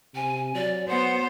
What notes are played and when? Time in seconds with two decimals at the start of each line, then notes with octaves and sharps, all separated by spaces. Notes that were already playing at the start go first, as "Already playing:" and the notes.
0.15 C3 G#5
0.55 F#3 D5
0.89 B3 C5 F#5